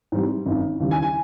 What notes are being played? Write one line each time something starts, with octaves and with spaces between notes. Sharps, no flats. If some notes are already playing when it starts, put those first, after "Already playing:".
G#2 E3 G3 C4
G#1 F#2 D#3
D#2 C#3 E3 G3
G#5
G#5